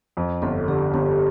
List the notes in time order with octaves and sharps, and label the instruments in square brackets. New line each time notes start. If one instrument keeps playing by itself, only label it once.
[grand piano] F2
[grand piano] G1 [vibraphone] A4
[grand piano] D3 [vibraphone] G4
[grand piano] G1 [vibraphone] G4